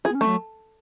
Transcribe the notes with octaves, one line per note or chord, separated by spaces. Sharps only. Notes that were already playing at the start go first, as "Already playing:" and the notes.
F4 G#4
B3
C#4
A3
F#3